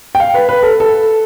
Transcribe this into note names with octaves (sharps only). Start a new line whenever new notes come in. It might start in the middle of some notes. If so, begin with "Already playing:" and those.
G5
F5
B4
B4
A4
A4